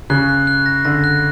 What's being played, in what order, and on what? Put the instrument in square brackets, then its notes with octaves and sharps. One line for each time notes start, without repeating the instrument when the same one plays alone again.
[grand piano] C#3 [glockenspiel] F#6
[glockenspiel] F#6
F#6
A#6
[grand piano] D3 [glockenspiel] A#6
[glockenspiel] F#6